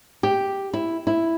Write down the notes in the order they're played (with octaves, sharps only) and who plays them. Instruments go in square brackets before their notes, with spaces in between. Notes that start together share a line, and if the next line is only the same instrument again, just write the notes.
[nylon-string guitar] G4
E4
E4